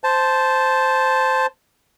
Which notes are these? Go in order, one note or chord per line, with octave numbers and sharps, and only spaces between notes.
C5 A5